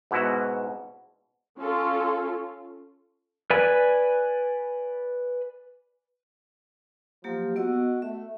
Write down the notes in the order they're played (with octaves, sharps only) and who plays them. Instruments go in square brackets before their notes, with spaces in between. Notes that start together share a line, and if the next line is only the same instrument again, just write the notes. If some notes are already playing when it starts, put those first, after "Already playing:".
[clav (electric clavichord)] G#2 B2 E4 F#4
[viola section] C#4 F4 A4
[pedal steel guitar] B4 D5 G#5 B5
[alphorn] F3 [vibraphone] F#3 A#3 G4
[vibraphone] B3 D#5 E6 [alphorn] F#4
[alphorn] A3 [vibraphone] E5